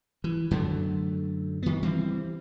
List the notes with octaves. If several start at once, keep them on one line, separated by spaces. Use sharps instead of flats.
E3
F#2 D3 F#3 A3
D#3 B3
E3 G3 C4